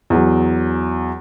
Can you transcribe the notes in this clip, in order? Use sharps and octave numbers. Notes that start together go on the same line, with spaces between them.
E2 F#3